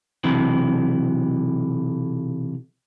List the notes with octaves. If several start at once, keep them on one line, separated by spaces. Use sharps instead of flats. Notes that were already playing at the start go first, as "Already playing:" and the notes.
B1 C3 E3